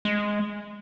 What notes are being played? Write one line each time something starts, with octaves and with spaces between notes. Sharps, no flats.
G#3